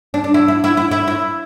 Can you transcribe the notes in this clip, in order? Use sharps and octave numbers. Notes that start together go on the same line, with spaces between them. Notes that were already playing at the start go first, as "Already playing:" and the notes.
D4
D4
E4
E4
E4
E4
E4
E4